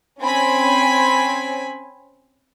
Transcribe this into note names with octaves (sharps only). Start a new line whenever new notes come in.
C4 C#4 G#5 B5